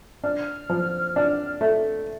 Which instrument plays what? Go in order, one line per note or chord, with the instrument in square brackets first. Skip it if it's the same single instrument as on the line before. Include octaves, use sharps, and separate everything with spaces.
[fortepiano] D4 [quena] F6
[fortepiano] F3
D4
A3